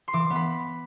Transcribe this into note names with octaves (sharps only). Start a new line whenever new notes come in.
C6
E3 D6
B3
B5